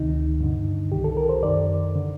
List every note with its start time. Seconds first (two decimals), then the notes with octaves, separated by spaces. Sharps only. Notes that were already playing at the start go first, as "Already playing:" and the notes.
Already playing: D2 C3 D#3 D#4
0.40 G2 D3
0.92 C2 C3 D#3 G4
1.04 A4
1.17 A#4
1.29 C5
1.43 F#2 D#3 D5
1.96 D3